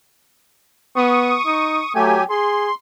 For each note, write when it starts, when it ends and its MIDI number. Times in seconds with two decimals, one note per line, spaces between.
0.96 1.38 59
0.96 1.93 85
0.96 1.93 87
1.46 1.83 63
1.95 2.24 54
1.95 2.20 57
1.95 2.24 67
1.95 2.24 80
2.30 2.69 68
2.30 2.75 84